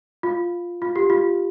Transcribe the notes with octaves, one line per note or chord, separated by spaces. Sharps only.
F4
F4
G4
F4